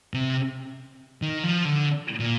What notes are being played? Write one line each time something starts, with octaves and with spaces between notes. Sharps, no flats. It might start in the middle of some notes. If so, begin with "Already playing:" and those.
C3
D#3
F3
D3
A#2